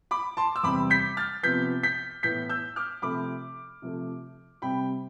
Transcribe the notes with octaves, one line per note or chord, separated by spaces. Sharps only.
B5 D6
A5 C6
E6
E2 C3 G3 C4 B5 D6
G6 B6
F6 A6
C3 F3 B3 G6 B6
G6 B6
A2 E3 B3 G6 B6
E6 G6
D6 F6
C3 F3 A3 C4 B5 D6
C3 F3 A3
C3 G3 C4 G5 B5